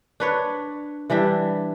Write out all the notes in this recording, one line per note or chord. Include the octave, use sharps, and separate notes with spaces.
D4 B4 C#5
E3 G3 D4 E5